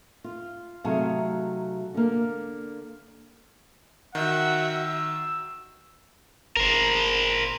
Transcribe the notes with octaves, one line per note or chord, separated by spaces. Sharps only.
F4
C3 F#3 A3 D#4 G#4 F5
D3 A#3
D#3 F#4 E5 F#5
E6
G1 A#4 C5